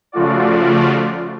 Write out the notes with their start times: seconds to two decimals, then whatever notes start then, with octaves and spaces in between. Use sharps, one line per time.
0.12 C#3 F3 A3 F4 F#4 D5